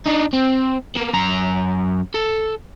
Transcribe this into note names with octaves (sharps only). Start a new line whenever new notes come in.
D4 D#4
C4
A#3 B3
F#2 A#5
A4